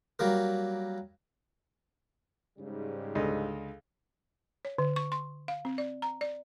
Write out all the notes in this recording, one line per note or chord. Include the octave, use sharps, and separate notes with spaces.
F#3 G3 A#3 A#4
G#2 C#3 G3
C#2 D3 D#5
C#5
D3
C#6
C6
F5
C4
D5
A#5
D5